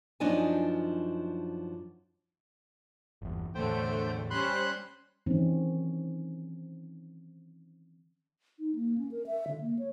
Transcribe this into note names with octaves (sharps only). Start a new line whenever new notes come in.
F#2 F3 D4 D#4 D#5 G#5
G1 E2
E2 A2 D3 A3 C5 G5
G3 C#4 C5 B5 C6 F#6
D#3 E3 F#3 C4 C#4 D#4
D#4
A#3
C#4
A#4
E5
D3
A#3
C#5